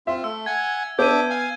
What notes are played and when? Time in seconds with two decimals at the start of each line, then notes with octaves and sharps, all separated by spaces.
0.07 C4 F4 E5
0.24 A3 E6
0.46 F#5 G#5 G#6
0.99 B3 D4 E5 D6 G6 D#7
1.30 F5 G#5